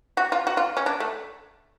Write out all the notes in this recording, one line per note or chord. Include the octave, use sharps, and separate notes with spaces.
F#4
F4
F#4
F4
C#4
D4
A3